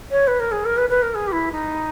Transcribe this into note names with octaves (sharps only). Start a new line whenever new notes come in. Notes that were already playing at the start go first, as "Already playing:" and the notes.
C#5
B4
A#4
G#4
A#4
B4
B4
A#4
G#4
G4
E4
D#4